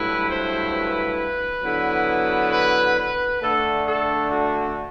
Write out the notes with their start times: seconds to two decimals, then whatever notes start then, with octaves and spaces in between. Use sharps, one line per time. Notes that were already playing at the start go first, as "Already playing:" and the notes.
Already playing: G2 F#3 A3 E4 B4
0.28 C5
0.73 B4
1.63 D3 F#3 B3 E4
2.52 B4
2.98 B4
3.42 D3 A3 D4 A4
3.88 A4
4.31 F#4